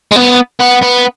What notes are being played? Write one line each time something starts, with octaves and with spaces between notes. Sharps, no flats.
G#3
B3
B3
B3